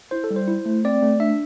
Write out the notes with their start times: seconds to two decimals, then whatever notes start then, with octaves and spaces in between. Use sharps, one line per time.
0.11 E4 C5
0.24 A4
0.31 G3
0.36 C5
0.48 E4
0.66 A3
0.85 C4 D5
1.02 A3
1.20 D4 E5